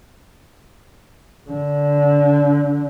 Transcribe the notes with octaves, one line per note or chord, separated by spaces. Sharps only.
D3